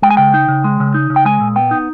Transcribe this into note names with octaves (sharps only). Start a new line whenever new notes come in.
G#3 G5
G#5
C#3 G5
D#4
C#3
G#3
C#3
D#4
C#3
G5
G#3 G#5
A#2
B3 G5
D#4